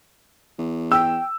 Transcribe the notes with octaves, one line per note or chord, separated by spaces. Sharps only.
E2
G5 E6